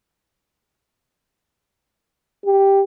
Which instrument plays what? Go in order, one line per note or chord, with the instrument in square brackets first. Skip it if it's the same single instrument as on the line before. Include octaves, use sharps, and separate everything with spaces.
[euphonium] G4